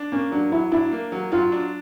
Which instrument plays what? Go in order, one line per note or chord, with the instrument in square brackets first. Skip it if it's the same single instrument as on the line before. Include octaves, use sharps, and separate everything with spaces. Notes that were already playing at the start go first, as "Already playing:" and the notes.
Already playing: [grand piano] D4
[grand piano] A#3 [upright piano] C#4
[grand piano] F#3 [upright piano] D4
[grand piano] F#3 [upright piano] E4
[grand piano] D4 [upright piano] E4
[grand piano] A#3
F#3
[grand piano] F#3 [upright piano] F4
[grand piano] D4